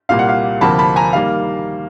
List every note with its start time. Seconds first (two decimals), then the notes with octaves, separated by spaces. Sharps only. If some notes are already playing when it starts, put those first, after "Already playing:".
0.09 C2 A#2 G3 A#3 F5
0.19 F#5
0.29 F5
0.61 D2 C3 F3 A#3 A5 B5
0.79 A5 B5
0.96 G#5 A#5
1.13 D#3 G3 A#3 F5